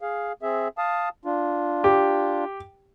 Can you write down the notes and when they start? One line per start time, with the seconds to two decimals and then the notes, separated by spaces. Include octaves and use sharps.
0.01 G#4 F5
0.42 C4 G#4 E5
0.78 F5 A5 D#6
1.25 D4 F4
1.84 G4